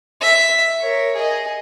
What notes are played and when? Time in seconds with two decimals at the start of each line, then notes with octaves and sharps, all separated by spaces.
0.21 E5
0.81 A#4 C#5
1.16 G#4 D#5